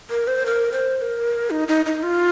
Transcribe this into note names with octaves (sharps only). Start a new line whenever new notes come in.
A#4
C5
A#4
C5
C5
A#4
D#4
D#4
D#4
F4